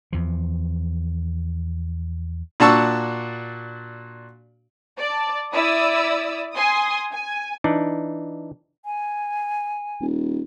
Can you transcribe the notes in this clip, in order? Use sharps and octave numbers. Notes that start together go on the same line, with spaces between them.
E2 F3
A#2 D4 F#4 A5 C#6 E6
D5 A5
E4 D5 D#6 E6
G#5 C6 D#6
G#5
E3 D4 D#4 D5
G#5
D#1